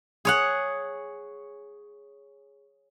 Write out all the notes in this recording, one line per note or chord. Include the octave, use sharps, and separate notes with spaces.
G#4 C#5 F#5